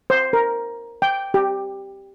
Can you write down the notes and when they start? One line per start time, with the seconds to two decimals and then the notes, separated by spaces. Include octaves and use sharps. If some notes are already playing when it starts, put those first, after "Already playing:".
0.10 C5
0.33 A#4
1.02 G5
1.34 G4